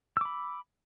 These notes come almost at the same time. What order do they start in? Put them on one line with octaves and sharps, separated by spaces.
E6 D6 B5